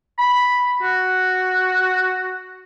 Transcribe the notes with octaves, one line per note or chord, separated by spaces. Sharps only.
B5
F#4